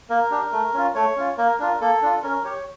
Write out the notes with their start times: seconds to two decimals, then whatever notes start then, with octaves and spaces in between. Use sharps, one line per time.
0.10 A#3 A#4
0.31 D4 G4
0.52 A3
0.74 C#4 F4
0.95 A3 C#5
1.17 C#4 F4
1.38 A#3 A#4
1.59 D4 F4 A#4
1.81 A#3 A4
2.02 D4 F4
2.23 C#4 A#4
2.44 G4 C#5